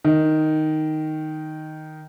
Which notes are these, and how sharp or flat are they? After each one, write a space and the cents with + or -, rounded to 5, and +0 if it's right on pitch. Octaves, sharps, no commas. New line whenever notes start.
D#3 +0 D#5 +0